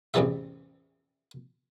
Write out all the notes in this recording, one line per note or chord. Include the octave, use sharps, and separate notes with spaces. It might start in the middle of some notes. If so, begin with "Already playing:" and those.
A1 E2 C3 E3 G3 E5